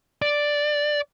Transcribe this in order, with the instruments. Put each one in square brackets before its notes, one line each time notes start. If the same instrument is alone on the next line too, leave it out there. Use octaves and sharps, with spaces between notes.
[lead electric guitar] D5